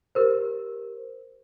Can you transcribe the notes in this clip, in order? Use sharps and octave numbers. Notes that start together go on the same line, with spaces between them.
G4 A#4 C5